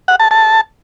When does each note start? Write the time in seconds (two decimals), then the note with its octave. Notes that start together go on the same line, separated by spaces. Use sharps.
0.08 F#5
0.20 A5
0.31 A5